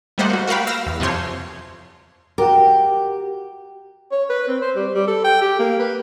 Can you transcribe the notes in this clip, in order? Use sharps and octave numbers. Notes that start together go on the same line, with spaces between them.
G3 A3 A#3 C5 D#5 F#5
A#3 F#4
F#4 A#4 B4 F5 G5 B5
F5 E6 A#6
E2
F2 C3 F3 C#5 C6
F#4 G4 A#4
C#5
B4
C4
C5
G3
G3
A4
G5
G4
A#3
B4